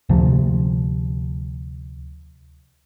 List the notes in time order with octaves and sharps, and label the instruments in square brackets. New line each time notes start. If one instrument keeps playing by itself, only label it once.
[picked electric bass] D2 C3 F3